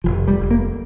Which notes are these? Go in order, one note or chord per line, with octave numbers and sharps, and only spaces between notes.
F1 F3
G3
F1
A#3